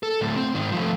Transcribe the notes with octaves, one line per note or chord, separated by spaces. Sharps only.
A4
D2 A2
C4
G#2 D#3
F3 A3